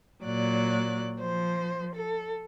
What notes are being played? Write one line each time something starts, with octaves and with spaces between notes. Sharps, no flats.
A#2 F#3 D5 F#6
F3 C5
A4